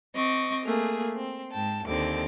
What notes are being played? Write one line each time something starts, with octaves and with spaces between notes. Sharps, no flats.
C4 D#5 C#6 D6
A3 A#3 G#4
C4
G#2 G5 A5
D#2 D3 C4 D6